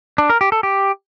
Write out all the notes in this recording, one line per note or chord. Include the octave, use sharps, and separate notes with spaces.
D4
A#4
G4
A4
G4